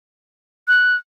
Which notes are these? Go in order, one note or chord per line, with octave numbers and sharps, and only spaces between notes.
F#6